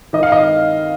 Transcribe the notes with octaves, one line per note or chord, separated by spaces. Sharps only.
D#3 D#5
F5
D#5